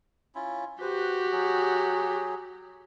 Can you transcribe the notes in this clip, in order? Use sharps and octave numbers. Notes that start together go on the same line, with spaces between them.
C#4 E4 F4
F#4 G4 B4 C5
F#3 G#4